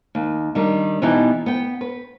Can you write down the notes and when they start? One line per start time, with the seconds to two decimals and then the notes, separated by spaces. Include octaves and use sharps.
0.15 D#2
0.55 D#3 G3 D4 D#4
1.02 B2 E3 B3 D#4 E4 G4
1.46 B3 G5
1.81 B4